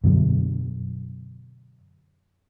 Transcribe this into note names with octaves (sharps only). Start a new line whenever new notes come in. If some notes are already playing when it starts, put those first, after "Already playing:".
F#2 B2 D3 F#3